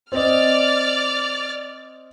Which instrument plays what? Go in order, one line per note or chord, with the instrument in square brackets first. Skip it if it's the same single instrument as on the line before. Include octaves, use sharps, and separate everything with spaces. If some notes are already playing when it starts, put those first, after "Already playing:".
[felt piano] C4 D#5 [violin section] D5 F6